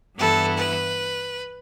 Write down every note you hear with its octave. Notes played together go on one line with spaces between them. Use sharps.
G2 E3 B3 E4 A4
B4